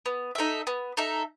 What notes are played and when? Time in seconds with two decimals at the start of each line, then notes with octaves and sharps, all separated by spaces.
0.06 B3
0.35 D#4 A4 E5
0.67 B3
0.97 D#4 A4 E5